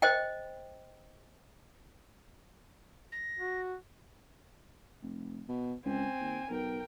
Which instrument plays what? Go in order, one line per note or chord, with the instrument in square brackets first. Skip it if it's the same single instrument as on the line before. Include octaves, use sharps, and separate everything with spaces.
[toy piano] C5 D#5 G5
[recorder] A#6
[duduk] F#4
[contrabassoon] F1
B2
[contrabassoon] C#2 [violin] C4 G#5
[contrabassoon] D#2
[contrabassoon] B1 [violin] A#4 G5